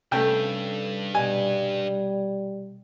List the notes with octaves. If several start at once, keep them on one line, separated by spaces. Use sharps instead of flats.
G2 C3 A3 C#4 A4 G5
B2 G3 D#5 G#5